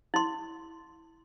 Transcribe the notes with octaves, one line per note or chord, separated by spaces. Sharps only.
E4 C6